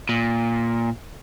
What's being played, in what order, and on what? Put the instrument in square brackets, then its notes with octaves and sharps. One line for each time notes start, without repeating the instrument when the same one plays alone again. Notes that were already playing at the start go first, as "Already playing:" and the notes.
[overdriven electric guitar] A#2